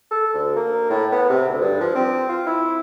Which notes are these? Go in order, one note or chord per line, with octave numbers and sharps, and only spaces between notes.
A4
D2
A#3
A2
B3
C3
D2
G2
F3
C4
F4
E4